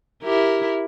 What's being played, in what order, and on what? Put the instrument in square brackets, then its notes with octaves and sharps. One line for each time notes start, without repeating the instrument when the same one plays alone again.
[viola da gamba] E4 G4 A#4